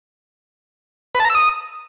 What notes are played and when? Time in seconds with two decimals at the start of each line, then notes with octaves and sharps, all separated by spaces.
1.15 B4
1.20 A5
1.25 A#5
1.30 E6
1.35 D#6